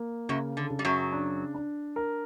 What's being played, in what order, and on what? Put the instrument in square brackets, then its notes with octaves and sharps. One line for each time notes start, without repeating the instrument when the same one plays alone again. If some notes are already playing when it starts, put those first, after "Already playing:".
Already playing: [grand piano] A#3
[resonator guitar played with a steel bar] F#2 F#3 [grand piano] C#3
[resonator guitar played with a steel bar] D3
[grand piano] C#3
[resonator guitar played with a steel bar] G3
F#2 F#3
[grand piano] D4
D4
A#4